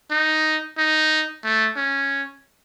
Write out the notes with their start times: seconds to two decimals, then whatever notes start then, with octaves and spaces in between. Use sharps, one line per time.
0.11 D#4
0.78 D#4
1.44 A3
1.76 C#4